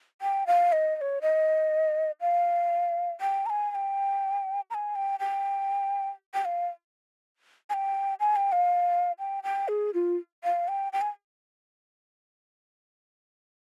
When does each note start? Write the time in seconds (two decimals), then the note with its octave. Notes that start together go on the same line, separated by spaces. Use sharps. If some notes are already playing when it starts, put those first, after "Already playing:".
0.22 G5
0.47 F5
0.72 D#5
0.97 D#5
1.01 C#5
1.22 D#5
2.21 F5
3.21 G5
3.46 A#5
3.50 G#5
3.71 G#5
3.75 G5
4.70 A#5
4.74 G#5
4.95 G5
5.20 G5
6.34 G5
6.45 F5
7.70 G#5
7.74 G5
8.20 G#5
8.36 G5
8.52 F5
9.19 G5
9.44 G5
9.68 G#4
9.94 F4
10.44 F5
10.68 G5
10.93 G5
11.01 G#5